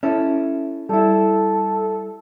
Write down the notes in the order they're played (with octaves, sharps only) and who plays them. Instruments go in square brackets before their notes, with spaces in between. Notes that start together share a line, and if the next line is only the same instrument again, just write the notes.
[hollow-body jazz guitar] C#4 E4 A4
[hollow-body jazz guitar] G3 E4 [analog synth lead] A4